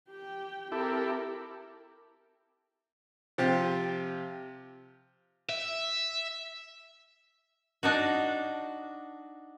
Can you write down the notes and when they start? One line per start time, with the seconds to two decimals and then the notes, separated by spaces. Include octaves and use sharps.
0.10 G4 G5
0.72 C4 E4 G4 A4 A#4
3.38 C3 F3 F4 G4
5.49 E5
7.83 D4 D#4 F#4